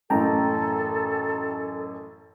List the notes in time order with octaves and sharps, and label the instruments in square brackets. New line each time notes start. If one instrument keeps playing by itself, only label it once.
[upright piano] A1 F#2 [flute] A4 [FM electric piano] G5 A5 A#5